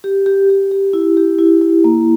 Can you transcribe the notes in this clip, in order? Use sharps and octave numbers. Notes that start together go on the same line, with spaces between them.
G4
G4
G4
G4
E4
G4
E4
E4
A#3